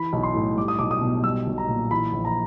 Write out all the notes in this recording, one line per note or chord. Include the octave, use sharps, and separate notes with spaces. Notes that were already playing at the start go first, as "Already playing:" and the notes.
Already playing: E3 B5
B1
C6
A2
G3 D6
D#6
B1 D6
D#6
B2
G3 E6
B1
A#5
A#2
E3 B5
A#1
A#5